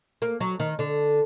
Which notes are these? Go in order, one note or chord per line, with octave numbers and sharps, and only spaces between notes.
A#3
F#3
D#3
D3